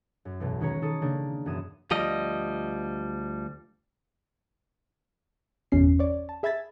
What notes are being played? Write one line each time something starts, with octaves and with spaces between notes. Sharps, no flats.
F#2
B1 E2 B2
D#3 G#3 C#4 B4 C#5 A#5
D#3 A4 D#6 C#7
C#3 A#3 D4
E1 F#2 G#4 D#6 D#7 E7
D2 F3 G3 D#5
G1 E2 B2 C#4 C7
C#5 D5
A5
G#4 E5 B5 G#6 A6 B6